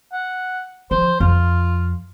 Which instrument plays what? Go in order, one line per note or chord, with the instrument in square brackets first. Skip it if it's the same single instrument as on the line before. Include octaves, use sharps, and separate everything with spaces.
[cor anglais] F#5
[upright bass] F3 [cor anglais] C5
[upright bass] F2 [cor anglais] F4